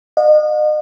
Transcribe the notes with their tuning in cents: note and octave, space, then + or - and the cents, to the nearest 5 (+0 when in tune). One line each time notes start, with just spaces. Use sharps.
D#5 -35 F#5 -45